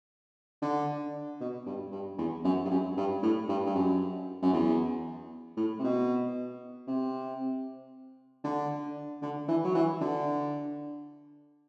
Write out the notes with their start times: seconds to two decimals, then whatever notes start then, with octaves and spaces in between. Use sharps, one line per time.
0.62 D3
1.40 B2
1.66 G2
1.92 G2
2.18 E2
2.44 F#2
2.65 G2
2.70 F#2
2.97 G2
3.23 A2
3.49 G2
3.66 G2
3.75 F#2
4.42 F#2
4.53 E2
5.57 A2
5.79 C3
5.83 B2
6.87 C3
8.44 D3
9.22 D3
9.48 E3
9.64 F#3
9.75 E3
10.00 D3